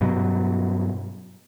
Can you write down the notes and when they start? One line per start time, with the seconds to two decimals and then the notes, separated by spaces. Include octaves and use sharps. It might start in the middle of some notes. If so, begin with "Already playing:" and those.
0.01 G2 B2 F#3